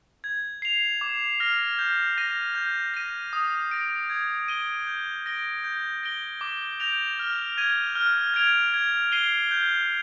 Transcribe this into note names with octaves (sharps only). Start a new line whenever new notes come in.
G#6
C7 F7
D6
F6 A#6
G6
A#6 D#7
G6
A#6 D#7
D#6
A#6 D7
G#6
D#7 G7
G6
A#6 D7 G7
G6
A#6 D7 G7
D6
G6 A#6 D7 F7
F6
G#6 D#7
F6
G#6 D7 F7
G#6
C7 D#7 G7
G6